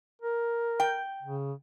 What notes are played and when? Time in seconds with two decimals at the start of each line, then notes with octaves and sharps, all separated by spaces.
0.22 A#4
0.80 G5
1.23 C#3